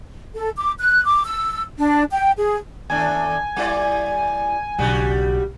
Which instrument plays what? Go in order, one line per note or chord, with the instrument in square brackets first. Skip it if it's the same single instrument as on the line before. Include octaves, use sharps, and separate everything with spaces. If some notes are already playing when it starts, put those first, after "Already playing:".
[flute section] A4
D6
F#6
D6
E6
D4
G5
G#4
[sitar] D#2 A3 D4 [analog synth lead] G#5
[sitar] G3 E4 D5
[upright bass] B1 [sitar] C#3 G3 F#4